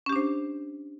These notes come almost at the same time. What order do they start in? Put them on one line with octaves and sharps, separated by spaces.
C#4 G4 D4 C5